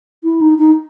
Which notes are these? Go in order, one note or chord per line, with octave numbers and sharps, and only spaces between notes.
E4
D#4
D#4